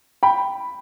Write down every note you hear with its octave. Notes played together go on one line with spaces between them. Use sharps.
G5 B5